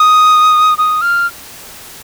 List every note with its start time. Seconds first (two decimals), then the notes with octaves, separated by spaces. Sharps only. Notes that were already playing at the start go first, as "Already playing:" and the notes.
Already playing: D#6
0.78 D#6
1.01 F6